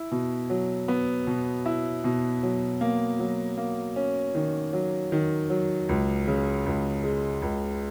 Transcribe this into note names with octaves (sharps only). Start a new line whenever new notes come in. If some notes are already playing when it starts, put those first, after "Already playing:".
Already playing: E4
B2
F#3
B3
B2
E4
B2
F#3
A#3
F#3
A#3
C#4
D#3
F#3
D#3
F#3
C#2
C#3
C#2
G#3
C#2